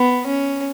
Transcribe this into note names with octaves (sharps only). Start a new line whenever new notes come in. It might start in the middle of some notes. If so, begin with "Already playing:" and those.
Already playing: B3
C#4